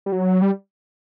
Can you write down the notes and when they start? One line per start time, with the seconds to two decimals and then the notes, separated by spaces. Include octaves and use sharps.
0.06 G3
0.12 F#3
0.42 G3